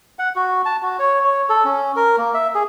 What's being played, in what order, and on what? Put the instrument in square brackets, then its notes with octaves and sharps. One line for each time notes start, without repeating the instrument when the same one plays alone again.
[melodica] F#5
F#4
A5
F#4
C#5
C#5
A4
C#4
A#4
A#3
E5
G#4